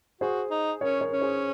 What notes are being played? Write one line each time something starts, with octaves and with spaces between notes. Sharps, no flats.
F#4 G#4 C5
D#4
C#4 A#4 C#5
A#4 C#5
C#4
G#4 C5